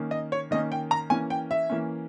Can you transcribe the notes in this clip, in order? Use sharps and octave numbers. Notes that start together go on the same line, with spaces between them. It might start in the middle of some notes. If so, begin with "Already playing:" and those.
Already playing: D#3 A#3 C#4
D#5
C#5
D#3 A#3 C#4 D#5
G5
A#5
E3 A#3 C#4 G#5
G5
E5
E3 A#3 C#4